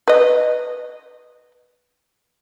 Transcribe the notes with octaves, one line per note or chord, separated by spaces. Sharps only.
B4 D#5